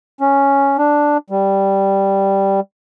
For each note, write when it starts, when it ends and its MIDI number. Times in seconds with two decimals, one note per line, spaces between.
0.21 0.77 61
0.78 1.17 62
1.30 2.60 55